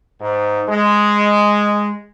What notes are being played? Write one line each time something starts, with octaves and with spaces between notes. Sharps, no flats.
G#2
G#3